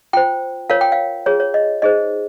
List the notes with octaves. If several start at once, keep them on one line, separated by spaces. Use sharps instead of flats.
F4 C5 G5
F4 A#4 C#5 F5
G5
F5
F4 G#4 C#5
C#5
D#5
D#4 G#4 C5 D#5